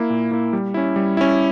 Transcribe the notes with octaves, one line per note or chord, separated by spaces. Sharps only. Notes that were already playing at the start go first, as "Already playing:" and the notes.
Already playing: A#3 E4
A#2
A#3 E4
G3
C#4 E4
G3
C#4 E4